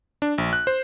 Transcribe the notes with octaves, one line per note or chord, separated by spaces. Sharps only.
D4
A#1
F#6
C5